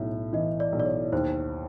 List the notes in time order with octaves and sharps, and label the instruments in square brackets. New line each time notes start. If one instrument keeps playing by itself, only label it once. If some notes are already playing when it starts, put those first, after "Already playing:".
Already playing: [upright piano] B1 A2 [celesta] E5
[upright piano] E3 [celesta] D#5
[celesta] D5
[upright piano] B1
[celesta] D5
C#5
[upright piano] D#2 [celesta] C5